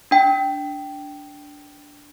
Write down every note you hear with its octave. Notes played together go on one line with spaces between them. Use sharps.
D4 G5